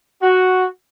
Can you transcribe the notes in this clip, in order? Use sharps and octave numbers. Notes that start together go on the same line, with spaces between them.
F#4